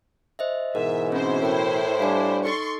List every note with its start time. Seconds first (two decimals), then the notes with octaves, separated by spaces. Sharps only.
0.39 C5 D#5 E5
0.75 G#2 B2 E3 A#4 E5
1.12 C4 C#4 E4 C5
1.42 A2 A#4 G5
2.00 G3 D4 F5 G#5
2.45 D#4 A4 C6 C#6 A6